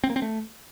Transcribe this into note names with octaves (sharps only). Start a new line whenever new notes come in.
C4
A#3
C4
A3